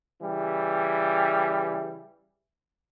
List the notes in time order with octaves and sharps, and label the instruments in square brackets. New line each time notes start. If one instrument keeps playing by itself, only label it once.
[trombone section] C#3 E3 G3